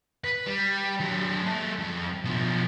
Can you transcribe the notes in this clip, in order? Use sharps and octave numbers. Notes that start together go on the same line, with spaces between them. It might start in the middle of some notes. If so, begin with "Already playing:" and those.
B4
G3
F#3 D4
G#3 A4
F2
B2 F3